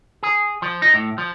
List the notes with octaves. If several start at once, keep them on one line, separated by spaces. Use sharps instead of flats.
G#4
F3
D#4
A2
F3